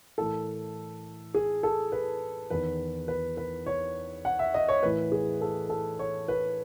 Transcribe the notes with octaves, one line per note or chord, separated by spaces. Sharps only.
A2 E3 A4
G#4
A4
B4
E2 D#3 B4
B4
B4
C#5
F#5
E5
D#5
C#5
A2 E3 B4
G#4
A4
A4
C#5
B4